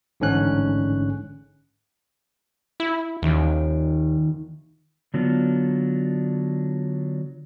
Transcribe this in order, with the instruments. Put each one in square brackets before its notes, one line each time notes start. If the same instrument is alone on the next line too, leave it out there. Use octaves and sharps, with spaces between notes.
[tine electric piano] A1 G#2 D3 C#4 F#6
[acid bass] E4
[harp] D#1 D#3 D7 [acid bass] D#2
[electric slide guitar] D3 F#3 B3 D4 F4 A4